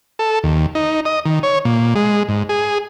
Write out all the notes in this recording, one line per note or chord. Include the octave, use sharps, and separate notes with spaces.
A4
D#2
D#4
D#5
D#3
C#5
A#2
G#3
G#2
G#4